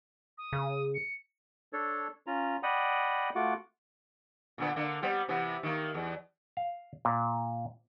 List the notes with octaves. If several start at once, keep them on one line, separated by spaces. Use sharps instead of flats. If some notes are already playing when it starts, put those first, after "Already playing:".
D#6
C#3
C#7
D4 A4 C#5
C#4 F4 A#5
D5 D#5 F#5 G5 B5 D#6
A3 F4 F#4 F#5 D6
A#2 D3 B3
D3 A#3
G3 B3 C4
C3 E3 B3
D#3 A#3
E2
F5
A#2